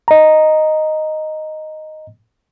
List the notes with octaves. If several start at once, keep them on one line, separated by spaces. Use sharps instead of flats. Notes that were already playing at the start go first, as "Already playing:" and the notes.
D#5 A#5